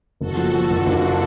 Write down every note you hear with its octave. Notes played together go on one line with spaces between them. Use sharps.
F#1 F#4 A4
F3
F3
F#1 D4 F#4
F#1